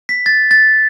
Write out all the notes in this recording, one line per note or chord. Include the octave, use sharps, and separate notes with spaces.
B6
A6
A6